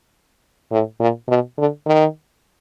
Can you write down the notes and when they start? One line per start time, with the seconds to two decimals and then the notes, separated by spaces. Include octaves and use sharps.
0.72 A2
1.00 A#2
1.29 B2
1.58 D3
1.87 D#3